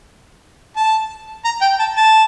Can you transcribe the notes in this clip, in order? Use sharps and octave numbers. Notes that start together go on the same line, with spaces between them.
A5
A#5
G5
A5
A5